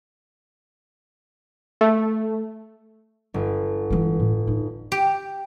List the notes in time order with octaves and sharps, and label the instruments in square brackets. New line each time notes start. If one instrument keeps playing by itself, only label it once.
[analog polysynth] A3
[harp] G1
[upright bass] E3 G#3
A2
D#4
[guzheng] G4